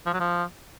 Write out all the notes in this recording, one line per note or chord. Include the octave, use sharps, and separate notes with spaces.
F3
F#3
F3